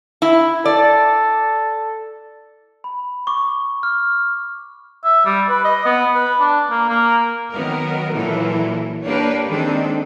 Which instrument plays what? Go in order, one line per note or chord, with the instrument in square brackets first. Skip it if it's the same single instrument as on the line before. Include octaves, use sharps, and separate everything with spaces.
[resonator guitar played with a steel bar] E4
[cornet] A4 [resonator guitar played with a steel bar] D5
[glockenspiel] B5
C#6 D6
F6
[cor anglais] E5
G3
B4
D#5
B3
B4
D4
A#3
A#3
[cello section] D#3 F#3 B3 A#4
A#2 E3 F#3 E4 A4
A#3 D4 G4 B4 C#5
D#3 G#3 C4 D4 A4